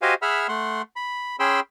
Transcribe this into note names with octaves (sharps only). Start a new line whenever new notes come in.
F#4 G4 C5 D#5 F5 G#5
G#4 E5 F#5 B5 E6 F6
A3 F#5 C6
B5
C#4 G#4 G5 B5 C6 E6